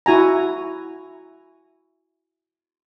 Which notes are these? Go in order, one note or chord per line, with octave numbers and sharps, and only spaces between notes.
E4 F#4 G#5 A#5